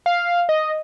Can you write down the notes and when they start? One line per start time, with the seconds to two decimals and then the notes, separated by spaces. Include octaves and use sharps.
0.06 F5
0.49 D#5